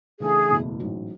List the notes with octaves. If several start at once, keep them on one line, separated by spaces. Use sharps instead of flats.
C#3 E3 A3 D4 G#4 A4
F#1 E2 B2 A3 E4
A1 G#2 F#3